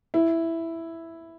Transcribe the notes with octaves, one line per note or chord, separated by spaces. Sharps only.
E4